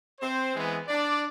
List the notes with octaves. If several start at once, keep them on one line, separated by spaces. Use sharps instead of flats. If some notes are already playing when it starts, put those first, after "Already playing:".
C4 C5
E3 G#3 B3
D4 D5